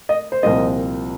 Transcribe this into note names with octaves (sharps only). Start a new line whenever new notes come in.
D#5
C5
C2 A#2 F3 C4 D#5